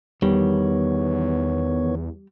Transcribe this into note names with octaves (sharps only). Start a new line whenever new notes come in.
E2 D#3 G3 B3 C#5